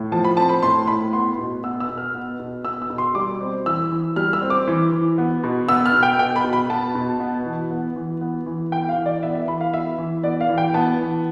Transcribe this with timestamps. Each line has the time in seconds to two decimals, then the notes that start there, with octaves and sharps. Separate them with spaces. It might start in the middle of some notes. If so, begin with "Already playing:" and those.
Already playing: A2
0.12 F3 A5
0.24 B5
0.37 C4 A5
0.49 B5
0.63 A2 C6
0.87 A2 B5
1.13 B3 C6
1.38 B2
1.64 B3 E6
1.80 E6
1.89 B2
1.98 F6
2.15 B3
2.39 B2
2.65 B3 E6
2.82 E6
2.90 B2
2.98 C6
3.15 G3 D6
3.41 C4
3.66 E3 E6
3.91 E3
4.16 G3 F6
4.33 E6
4.42 C4
4.50 D6
4.67 E3
4.92 E3
5.18 B3
5.44 B2
5.68 B3 E6
5.86 F6
5.94 B2
6.03 G5
6.19 B3 G5
6.36 B5
6.44 B2
6.53 B5
6.70 B3 A5
6.95 B2
7.20 B3
7.45 E3
7.71 B3
7.96 E3
8.21 B3
8.46 E3
8.72 B3 G5
8.89 F5
8.97 E3
9.06 D5
9.23 B3 E5
9.35 E5
9.48 E3 B5
9.61 F5
9.74 B3 E5
9.98 E3
10.24 B3 D5
10.41 F5
10.49 E3
10.58 G5
10.74 B3 A5
11.00 E3